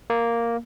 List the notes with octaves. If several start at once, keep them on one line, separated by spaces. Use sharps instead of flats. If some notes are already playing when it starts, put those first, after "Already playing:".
A#3